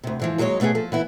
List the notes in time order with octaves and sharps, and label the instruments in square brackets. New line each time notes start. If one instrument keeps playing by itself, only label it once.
[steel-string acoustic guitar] D2 C3
G#2 E3 F3
D#2 F#3 G#3 D#4 C#5
B2 A3 B3 G4 G#4
F3 A4
E3 B3 E4